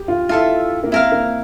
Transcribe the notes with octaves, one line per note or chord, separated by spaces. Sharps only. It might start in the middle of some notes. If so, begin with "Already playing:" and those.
Already playing: G4
F4
E4 F4 A4 E5
A#3
C4 E4 A#4 F5
A#3